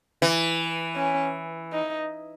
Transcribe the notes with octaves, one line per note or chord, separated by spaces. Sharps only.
E3
C#4
D#4